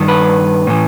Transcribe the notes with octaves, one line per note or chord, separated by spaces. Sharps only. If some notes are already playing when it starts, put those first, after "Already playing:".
Already playing: G2 D#3
B4
A2 E3